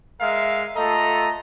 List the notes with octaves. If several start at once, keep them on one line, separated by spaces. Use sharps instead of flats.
G#3 A#4 E5 F5
A3 F4 A4 D#5 A#5